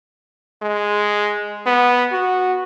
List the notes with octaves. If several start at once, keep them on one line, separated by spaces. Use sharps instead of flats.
G#3
B3
F#4